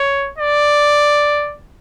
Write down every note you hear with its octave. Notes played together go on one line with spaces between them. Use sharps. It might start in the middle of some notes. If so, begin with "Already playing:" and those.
Already playing: C#5
D5